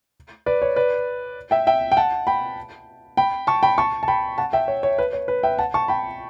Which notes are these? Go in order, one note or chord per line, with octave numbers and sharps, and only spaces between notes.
B4 D5
C#5
B4 D5
E5 G5
E5 G5
G5
F#5 A5
G5 B5
G5 B5
A5 C#6
G5 B5
A5 C#6
A5
G5 B5
F#5 A5
E5 G5
C#5
C#5
B4
C#5
B4
E5 G5
F#5 A5
A5 C#6
G5 B5